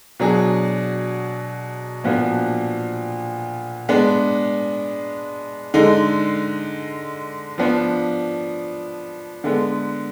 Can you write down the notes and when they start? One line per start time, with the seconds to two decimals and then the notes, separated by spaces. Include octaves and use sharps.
0.20 B2 F#3 D4 G#4
2.04 A#2 F3 B3 D4 F#4
3.89 G#3 B3 D4
5.74 D3 G#3 D#4
7.58 F3 B3 D4
9.44 D3 G#3 B3